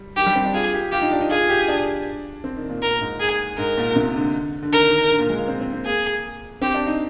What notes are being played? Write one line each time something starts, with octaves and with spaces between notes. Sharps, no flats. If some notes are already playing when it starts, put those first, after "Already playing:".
Already playing: G3
D#3 G4
G3
C4
D4
F4 G#4
G4
F4 G4
D#4
D4
D#4
F4 G#4
G4
D4
C4
D#3
A#2
A#2 A#4
G#2
G#4
G#2 A#4
A#2
C3
D3
D3
D#3 A#4
D#3
D3
A#2
G#3
A#3
C4
C4
C4
A#3 G#4
C4 G4
D4
D#4